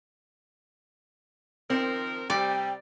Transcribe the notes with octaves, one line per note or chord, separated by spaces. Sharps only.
D#3 F3 C4 A#4
C3 G3 D5 G5